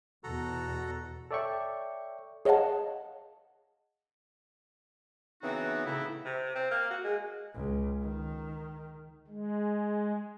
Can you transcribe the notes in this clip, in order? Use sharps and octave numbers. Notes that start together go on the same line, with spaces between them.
E2 B2 F#4 A4 A#5
A4 C#5 D5 E5 G5 C#6
G#4 C#5 D#5 F5 F#5 A5
C#3 E3 B3 C4 D#4 F#4
A2 C#3 E4
C3
C4
A#3
F#4
G#3
C#2
D#3
G#3